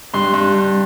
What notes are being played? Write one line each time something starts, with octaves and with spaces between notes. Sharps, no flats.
G2 C6
G2
G2